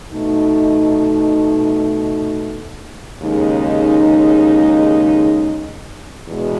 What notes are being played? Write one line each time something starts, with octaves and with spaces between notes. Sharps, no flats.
B2 A3 D#4
D#2 C#3 G#3 D#4
E2 B2 G#3